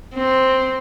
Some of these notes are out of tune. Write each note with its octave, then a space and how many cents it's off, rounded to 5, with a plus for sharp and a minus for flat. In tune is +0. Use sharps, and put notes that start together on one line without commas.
C4 +0